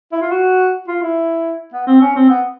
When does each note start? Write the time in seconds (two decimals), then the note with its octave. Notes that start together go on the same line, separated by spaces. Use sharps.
0.12 E4
0.21 F4
0.31 F#4
0.88 F4
1.02 E4
1.73 B3
1.87 C4
2.01 C#4
2.15 C4
2.30 B3